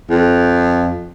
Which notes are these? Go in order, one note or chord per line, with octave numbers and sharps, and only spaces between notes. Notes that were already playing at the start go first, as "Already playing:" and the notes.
F2